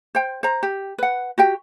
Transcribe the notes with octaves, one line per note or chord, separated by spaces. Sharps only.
C5 G5
C5 A#5
G4
B4 F#5
F#4 G4 G5